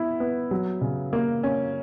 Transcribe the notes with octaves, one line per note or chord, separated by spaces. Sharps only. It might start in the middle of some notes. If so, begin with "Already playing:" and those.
Already playing: B3 E4
B3
F#3
C#3
A#3
C#4